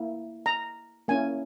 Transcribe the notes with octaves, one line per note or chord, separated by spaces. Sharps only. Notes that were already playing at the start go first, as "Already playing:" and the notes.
Already playing: A#3 E4
A#5
A#3 C#4 E4 G#5